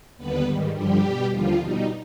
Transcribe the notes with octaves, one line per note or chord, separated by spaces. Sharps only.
D#2 D3 G3 B3 B4
G#2 D#3 G3
G2 D3 F3 G3 G4
B2 G3
D#2 D3 F3 G3 F4
B2 G3 D#4